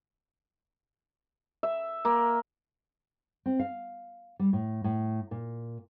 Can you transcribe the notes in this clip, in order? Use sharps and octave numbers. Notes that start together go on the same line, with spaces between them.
E5
A#3
C4
F5
G3
A2
A2
A#2